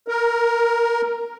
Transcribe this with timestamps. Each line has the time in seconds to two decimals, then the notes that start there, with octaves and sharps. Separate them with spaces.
0.08 A#4